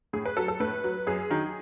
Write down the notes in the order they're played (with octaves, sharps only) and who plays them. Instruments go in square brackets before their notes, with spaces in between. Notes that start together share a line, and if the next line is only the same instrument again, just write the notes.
[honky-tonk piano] A2 G#4
B4
F#3 A4
A4
A2 B4
F#3
F#2 G#4
D#3 F#3